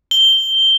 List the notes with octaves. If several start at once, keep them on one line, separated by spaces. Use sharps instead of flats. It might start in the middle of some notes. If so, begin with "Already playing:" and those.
G7